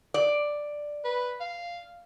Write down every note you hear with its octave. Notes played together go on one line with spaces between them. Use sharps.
D5
B4
F5